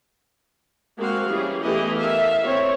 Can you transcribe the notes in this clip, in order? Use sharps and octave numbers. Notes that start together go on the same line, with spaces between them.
G#3 A#3 C4 F#4 F5
E3 G3 C#4 G#4
E3 A3 B3 E4 G4 D#5
A#4 E5 F5
C4 C#5